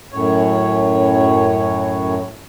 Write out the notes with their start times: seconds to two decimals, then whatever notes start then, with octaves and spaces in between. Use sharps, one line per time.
0.12 F#2 A2 C#5